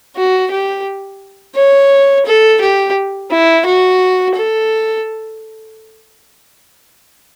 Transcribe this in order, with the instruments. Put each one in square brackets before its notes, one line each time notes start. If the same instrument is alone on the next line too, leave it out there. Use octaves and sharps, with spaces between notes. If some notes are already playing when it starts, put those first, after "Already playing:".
[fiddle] F#4
G4
C#5
A4
G4
E4
F#4
A4